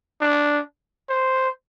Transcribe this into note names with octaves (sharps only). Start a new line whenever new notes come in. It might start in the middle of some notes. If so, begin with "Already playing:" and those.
D4
C5